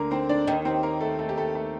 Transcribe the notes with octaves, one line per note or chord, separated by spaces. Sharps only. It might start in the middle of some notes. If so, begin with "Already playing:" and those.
Already playing: D2 D3 A#3 A#4
C4 C5
D4 D5
D#2 D#3
C4 C5
A#3 A#4
A3 A4
A3 A4
G4
A3 A4
A3 A4